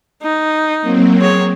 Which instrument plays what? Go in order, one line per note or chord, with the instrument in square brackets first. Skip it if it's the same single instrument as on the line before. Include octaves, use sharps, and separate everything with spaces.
[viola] D#4
[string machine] F#3 A#3 C4
[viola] G#4 C#5